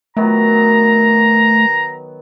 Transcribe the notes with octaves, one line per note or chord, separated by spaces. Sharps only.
D#3 F#3 A3 B3 A#5